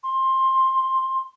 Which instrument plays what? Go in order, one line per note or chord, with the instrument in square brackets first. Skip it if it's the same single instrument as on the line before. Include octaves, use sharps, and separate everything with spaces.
[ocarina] C6